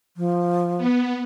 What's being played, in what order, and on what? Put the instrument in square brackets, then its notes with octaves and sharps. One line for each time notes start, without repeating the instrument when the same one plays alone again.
[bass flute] F3
[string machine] B3